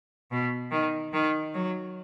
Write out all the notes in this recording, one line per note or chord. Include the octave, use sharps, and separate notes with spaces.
B2
D#3
D#3
F#3